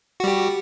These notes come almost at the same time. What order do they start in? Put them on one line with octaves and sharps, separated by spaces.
F#4 G3 G4